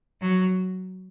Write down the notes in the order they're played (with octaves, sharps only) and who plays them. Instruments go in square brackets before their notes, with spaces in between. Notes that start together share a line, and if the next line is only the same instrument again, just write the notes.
[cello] F#3